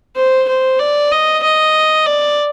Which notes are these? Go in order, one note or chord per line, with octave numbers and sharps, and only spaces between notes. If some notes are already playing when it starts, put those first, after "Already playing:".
C5
C5
D5
D#5
D#5
D5